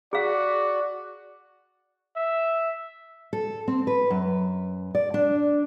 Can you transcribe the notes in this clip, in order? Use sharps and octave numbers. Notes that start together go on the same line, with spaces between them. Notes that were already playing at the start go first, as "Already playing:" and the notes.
F#4 G#4 D5 F5
E5
A4
C4
B4
F#2
D5
D4